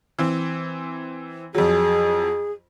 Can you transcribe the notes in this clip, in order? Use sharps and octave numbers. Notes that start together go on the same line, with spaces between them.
E3 C4
F2 F#3 G#4